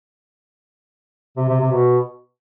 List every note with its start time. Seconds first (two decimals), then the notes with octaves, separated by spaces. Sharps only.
1.37 C3
1.49 C3
1.61 C3
1.72 B2